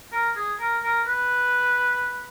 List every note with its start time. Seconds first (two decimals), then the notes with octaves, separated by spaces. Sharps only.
0.12 A#4
0.36 G#4
0.60 A#4
0.83 A#4
1.07 B4